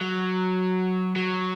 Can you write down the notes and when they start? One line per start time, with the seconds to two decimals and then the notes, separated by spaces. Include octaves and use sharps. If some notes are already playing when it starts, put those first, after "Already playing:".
0.01 F#3
1.16 F#3